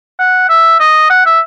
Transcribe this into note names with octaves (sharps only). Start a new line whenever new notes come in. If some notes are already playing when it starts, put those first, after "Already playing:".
F#5
E5
D#5
F#5
E5